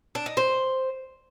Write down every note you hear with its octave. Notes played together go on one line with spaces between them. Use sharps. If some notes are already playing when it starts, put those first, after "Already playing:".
D4
D#4
C5